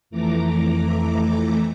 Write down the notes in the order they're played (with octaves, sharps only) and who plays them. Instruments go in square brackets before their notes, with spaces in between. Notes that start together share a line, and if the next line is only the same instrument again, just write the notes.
[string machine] F2 E3 A3 A#5 D6